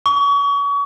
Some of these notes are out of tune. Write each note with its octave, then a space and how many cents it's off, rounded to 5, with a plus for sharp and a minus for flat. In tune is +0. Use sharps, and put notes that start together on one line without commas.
C#6 +35